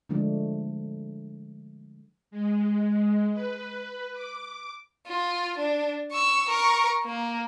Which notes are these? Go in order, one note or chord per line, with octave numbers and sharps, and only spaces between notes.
D3 F3 G#3 A3 D4
G#3
B4
D6
F4
D4
C#6 E6
A#4 C#6
A#3